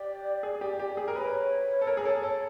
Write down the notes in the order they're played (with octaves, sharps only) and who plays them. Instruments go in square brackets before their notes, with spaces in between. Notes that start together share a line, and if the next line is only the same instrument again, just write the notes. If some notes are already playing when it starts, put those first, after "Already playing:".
Already playing: [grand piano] G4 [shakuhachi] D5
[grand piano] G#4
G4
G4
G#4
A#4
[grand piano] B4 [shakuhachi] C#5
[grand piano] A4
A#4
G#4
A4
A4